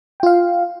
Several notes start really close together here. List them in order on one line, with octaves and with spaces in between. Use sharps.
G5 F4 F5